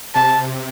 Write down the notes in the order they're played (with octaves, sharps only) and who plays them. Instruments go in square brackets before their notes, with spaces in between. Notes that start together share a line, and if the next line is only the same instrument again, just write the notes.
[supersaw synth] C3 [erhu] A5